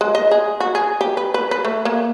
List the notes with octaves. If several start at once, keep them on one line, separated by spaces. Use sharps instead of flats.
G#3
D#5
G#4
F#4
G#4
G4
B4
B4
B4
A3
A#3